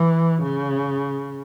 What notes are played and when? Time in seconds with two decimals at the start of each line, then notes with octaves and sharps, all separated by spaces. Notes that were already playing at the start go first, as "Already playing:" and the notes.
Already playing: E3
0.43 C#3